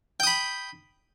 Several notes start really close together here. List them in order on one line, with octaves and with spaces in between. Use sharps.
G5 D#6 B5